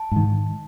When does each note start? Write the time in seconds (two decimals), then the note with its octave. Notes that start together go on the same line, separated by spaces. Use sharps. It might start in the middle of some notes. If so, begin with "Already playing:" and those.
Already playing: A5
0.12 G#2 D#3